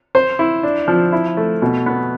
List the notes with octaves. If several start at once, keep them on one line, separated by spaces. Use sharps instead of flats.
C5
E4
D4
F3
E4
A3
B2
B3